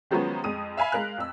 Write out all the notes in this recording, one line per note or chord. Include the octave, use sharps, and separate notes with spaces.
D#3 F3 F#3 G#3 B3 C#4
F2 G#3 D#6 D#7
E5 F5 G#5 B5 B6
G#3 A#4 F5 F#6
F2 E6